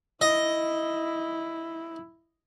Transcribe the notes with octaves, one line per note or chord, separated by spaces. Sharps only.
E4 D#5